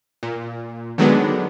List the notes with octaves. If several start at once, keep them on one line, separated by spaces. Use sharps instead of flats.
A#2
D3 D#3 F#3 G#3 B3 D4